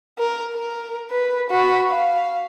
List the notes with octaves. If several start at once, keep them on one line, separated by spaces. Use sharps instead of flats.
A#4
A#4
B4
F#4 B5
F5